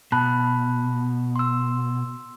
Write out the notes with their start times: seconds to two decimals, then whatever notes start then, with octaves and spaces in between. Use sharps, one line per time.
0.12 B2 A5 B5 F#6
1.36 C6 E6